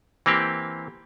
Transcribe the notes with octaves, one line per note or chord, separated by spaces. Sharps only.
E3 A#3 C4 G4